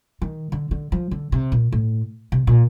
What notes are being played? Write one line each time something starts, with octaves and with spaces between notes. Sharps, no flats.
D#3
D3
D3
F3
D3
C3
A#2
A2
C3
A#2